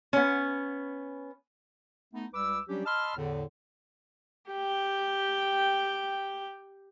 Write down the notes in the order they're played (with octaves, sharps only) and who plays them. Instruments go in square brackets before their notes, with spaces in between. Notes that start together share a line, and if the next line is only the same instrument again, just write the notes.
[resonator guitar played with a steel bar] B3 C#4
[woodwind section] A3 B3 D#4
C#2 G3 B4 D6 E6
F#3 G3 C#4 D4 G4
D#5 A5 B5 C6 E6 F6
E2 A2 D3
[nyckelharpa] G4 G5